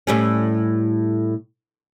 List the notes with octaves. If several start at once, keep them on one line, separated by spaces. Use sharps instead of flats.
A2 G3 C#4